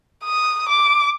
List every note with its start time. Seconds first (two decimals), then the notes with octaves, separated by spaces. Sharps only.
0.25 D#6
0.69 D6